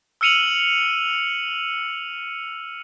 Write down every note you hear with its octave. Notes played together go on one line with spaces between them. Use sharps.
E6 F6 C#7 D#7 F7 F#7